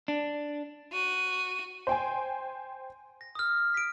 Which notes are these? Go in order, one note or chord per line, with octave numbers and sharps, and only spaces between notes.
D4
F#4 D#7
C5 G5 G#5
A#6
D#6 F6
B6 D7